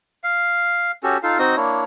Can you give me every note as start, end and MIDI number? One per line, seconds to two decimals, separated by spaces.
0.24 0.92 77
1.03 1.17 61
1.03 1.17 66
1.03 1.17 67
1.03 1.17 69
1.23 1.38 63
1.23 1.38 65
1.23 1.38 69
1.23 1.38 77
1.39 1.56 60
1.39 1.56 63
1.39 1.56 66
1.39 1.56 75
1.56 1.84 58
1.56 1.84 62
1.56 1.84 64
1.56 1.84 73